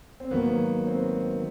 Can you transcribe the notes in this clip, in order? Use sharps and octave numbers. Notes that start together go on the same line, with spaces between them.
C4
G#2 D#3 F#3 A#3 B3
C4